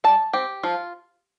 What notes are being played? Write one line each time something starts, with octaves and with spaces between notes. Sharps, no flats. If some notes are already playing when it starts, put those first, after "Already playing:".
G3 A5
C4 G4
F3 F4